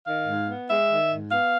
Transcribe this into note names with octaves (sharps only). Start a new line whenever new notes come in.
D#3 F5
G#2
B3
G#3 E5
D#3
G#2
B3 F5